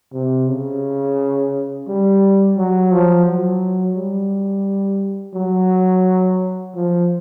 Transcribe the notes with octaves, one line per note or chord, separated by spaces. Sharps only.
C3
C#3
G3
F#3
F3
F#3
G3
F#3
F3